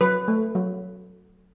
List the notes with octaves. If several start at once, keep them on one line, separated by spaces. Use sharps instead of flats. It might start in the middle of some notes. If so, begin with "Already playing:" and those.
F#3 B4
A3
F#3